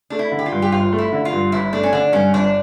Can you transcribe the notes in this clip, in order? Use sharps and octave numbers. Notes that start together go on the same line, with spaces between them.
A3 D4
E4
D3
G4
F4
G2
G4
G1 F4
A3
E4
D3
F4
G2
G1 E4
A3 D4
C#4
D3 D4
G2 C#4
G1 D4